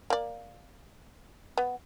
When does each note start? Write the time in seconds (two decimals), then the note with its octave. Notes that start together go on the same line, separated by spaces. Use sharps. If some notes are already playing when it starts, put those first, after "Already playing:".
0.10 A#3 D5
1.58 B3